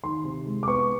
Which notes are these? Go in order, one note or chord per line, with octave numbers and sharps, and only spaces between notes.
D#3 C6
C3
G#3
D6
B3 C#6